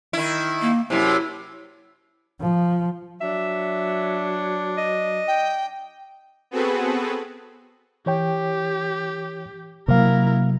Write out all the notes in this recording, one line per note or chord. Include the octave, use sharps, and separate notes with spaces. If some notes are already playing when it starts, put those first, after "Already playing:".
D#3 E4
A#3
F#2 C3 E4
F3
F#3 D4 E5
D#5
G5
B3 C4 F#4 G#4 A4 B4
E3 G4 C#5 G5
C3 F#3 A#3 E4 A#4 F5